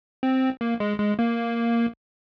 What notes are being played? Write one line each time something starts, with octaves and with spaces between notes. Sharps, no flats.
C4
A#3
G#3
G#3
A#3